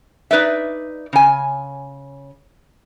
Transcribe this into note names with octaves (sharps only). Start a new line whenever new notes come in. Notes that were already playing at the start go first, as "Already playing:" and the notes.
D#4 B4 D5 E5
C#3 G#5